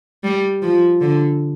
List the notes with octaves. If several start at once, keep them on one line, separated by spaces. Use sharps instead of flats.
G3
F3
D3